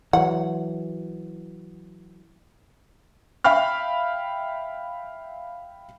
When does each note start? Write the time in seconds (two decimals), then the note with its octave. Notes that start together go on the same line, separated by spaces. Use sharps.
0.13 E3 F#3 F#5
3.44 E5 F5 G5 B5 F6